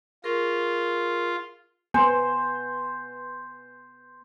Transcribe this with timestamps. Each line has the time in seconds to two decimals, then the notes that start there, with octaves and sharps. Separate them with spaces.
0.24 F4 G#4 A#4 C#6
1.94 B3 C5 G#5 C6